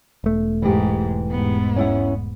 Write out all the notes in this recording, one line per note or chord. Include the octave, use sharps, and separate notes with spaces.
E1 A3
G#2 E3 G4
G#2 B3
C#4 E4 F#5